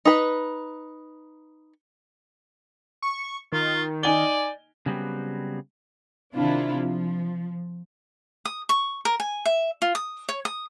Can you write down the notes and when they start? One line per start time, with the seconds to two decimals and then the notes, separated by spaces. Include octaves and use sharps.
0.05 D#4 B4
3.02 C#6
3.52 D#3 F4
4.03 D#4 D5 G#5 G7
4.86 C#3 F#3 G3 B3 C4
6.34 C3 D#3 D4 E4 F4
6.77 F3
8.45 D#6
8.69 C#6
9.05 A#4
9.20 G#5
9.46 E5
9.82 F4
9.95 D#6
10.29 C#5
10.45 D#6